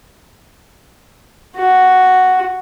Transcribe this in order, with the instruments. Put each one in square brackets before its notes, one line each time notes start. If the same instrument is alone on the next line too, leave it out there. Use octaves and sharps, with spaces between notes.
[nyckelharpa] F#4